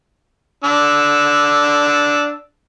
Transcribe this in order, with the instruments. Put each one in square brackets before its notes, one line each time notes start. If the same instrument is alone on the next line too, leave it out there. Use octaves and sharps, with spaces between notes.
[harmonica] D4 E6